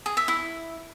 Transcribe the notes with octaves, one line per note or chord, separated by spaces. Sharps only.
G#4
E5
E4